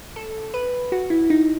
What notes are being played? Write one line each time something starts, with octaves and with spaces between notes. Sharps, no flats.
A4
B4
F#4
E4
D#4